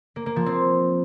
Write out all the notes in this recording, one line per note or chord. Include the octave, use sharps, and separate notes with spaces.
A#3
A#3
F3
C4